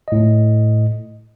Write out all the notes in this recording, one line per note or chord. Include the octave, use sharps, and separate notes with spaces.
A2 D#5